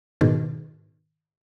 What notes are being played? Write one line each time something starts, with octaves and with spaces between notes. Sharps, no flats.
G#2 B2 D#3